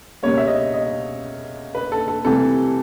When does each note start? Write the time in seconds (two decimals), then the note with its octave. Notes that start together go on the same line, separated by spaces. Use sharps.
0.23 C#2 B2 G3 A#3 C#5
0.38 E5
0.48 D#5
0.73 D#5
1.75 B4
1.92 A4
2.08 A4
2.25 C2 C3 E3 A3 A4